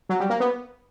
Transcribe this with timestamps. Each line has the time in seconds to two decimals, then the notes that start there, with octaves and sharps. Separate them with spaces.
0.09 F#3
0.20 G3
0.30 A#3
0.40 B3